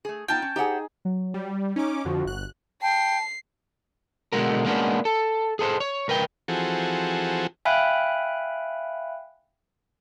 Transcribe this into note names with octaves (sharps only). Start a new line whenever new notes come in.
A3 G#4
B3 D#4 F4 G5 A5
C#4
D#4 G4 G#4 C5 F#5
F#3
G3
C#4 D#4 D6
F2 D3 F3 F#4
G1 F#6
G5 A5 C7
B2 D3 G#3 F#4 A#4
G#3 A#3 B3 C#4 D4 F#4
A4
G#4 A4 B4 C5
C#5
C#2 A#4 B4 G5
E3 F3 C4 F#4 G#4 A4
E5 F5 G5 G#5 B5 F#6